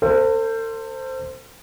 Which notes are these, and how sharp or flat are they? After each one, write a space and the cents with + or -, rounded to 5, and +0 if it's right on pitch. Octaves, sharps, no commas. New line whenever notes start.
A4 +40 C5 +0